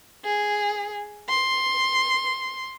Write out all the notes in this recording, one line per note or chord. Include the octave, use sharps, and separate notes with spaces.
G#4
C6